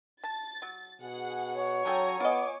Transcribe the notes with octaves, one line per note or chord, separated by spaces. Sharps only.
A5 A6
F#3
B2 G#4 F#5
C#5
C#3 F#3 A4 G5 G#5 A#5 G#6
B3 F4 D#5 G#5 D6